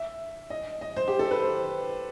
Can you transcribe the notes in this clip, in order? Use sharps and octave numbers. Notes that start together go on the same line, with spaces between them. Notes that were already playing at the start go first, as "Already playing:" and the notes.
Already playing: E5
D#5
D#5
C5
G4
A4
B4
C5